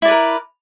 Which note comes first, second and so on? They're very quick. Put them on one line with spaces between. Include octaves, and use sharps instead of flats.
E4 D5 B4 A#4